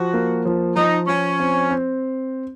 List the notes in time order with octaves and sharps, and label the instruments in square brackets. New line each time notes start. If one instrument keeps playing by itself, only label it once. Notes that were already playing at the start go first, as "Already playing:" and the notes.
Already playing: [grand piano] F3 [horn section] F#4
[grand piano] A#3
F3
[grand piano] F3 [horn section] D#4
[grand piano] F3 [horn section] C#4
[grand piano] C4
C4